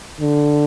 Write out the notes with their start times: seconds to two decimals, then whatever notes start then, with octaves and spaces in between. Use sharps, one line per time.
0.20 D3